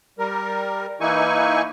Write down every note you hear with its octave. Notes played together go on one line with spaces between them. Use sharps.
G3 A#4
E3 A#3 D#4 E4 G#5 C#6